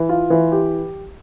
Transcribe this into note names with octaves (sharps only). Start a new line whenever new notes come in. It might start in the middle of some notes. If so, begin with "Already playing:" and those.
Already playing: E3
F4
E3
G4